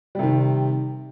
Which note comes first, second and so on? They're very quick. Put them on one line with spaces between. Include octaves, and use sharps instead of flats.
G3 C3 D#3